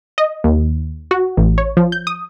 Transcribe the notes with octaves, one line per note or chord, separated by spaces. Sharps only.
D#5
D#2
F#4
A1
C#5
F3
G6
D#6